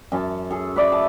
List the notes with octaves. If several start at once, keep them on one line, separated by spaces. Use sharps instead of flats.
F#2 C#4 A5
G#4 A4
B4 D5 E5
A5